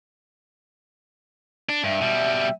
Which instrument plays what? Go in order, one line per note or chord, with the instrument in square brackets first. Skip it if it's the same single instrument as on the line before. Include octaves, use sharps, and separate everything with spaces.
[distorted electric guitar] D4
[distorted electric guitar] G2 [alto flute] E5
[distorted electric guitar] B2 G3